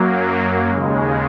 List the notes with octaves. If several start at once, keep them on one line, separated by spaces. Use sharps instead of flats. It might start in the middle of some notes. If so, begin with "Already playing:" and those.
Already playing: F#2 F#3 A#3
D#2 C#3 G#3